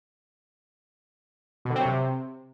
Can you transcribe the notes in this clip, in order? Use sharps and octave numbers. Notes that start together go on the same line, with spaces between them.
B2
D3
C4
F#3
C3